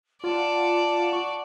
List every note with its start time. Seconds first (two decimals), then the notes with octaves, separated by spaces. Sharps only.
0.24 F4 D5 F#5 A5
1.13 C#6